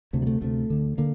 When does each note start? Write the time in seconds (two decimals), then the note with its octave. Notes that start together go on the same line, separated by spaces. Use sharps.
0.13 D2 C3 A3
0.22 G3
0.27 A3
0.42 D2 C3 A3
0.70 D2 D3
0.98 D3 A#3